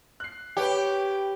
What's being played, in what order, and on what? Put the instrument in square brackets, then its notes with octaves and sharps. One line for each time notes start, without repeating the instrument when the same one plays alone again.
[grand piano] F#6 C7
[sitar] G4 [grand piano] B4 C#5 G5